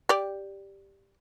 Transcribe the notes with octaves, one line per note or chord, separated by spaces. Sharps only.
G4 D5